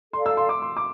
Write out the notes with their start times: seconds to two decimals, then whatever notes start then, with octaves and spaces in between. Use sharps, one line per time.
0.13 A4 D5 F5 C6
0.26 E6
0.37 C6
0.49 D6
0.62 C6
0.77 D6